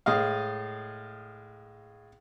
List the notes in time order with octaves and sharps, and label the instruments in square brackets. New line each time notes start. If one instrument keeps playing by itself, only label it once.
[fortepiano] A2 G#3 D#5 F5